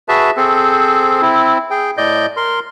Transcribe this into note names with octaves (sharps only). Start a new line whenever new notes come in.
F#4 G#4 B4 E5 A5
C4 G#4 A4 C5
C4 E4
G#4 G5
A2 D5 D#5 G6
A#4 C6